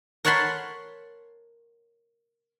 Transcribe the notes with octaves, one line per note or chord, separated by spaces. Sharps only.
A#4 C#5 F#5 A5 B5 C6